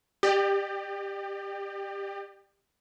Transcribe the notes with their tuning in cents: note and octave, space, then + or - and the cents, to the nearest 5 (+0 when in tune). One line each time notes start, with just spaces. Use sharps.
G4 +15 D5 +45